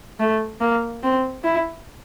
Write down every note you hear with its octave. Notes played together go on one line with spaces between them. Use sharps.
A3
A#3
C4
E4